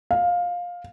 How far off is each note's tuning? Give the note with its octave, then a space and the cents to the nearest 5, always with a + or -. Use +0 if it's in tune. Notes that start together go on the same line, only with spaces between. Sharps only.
F5 +15